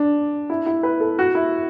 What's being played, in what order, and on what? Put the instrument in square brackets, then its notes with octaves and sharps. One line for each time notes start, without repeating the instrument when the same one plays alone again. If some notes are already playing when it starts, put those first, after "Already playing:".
Already playing: [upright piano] D4
E4
E4
B4
A4
F#4
E4